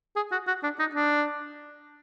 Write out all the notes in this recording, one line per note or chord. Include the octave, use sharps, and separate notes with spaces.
G#4
F#4
F#4
D4
D#4
D4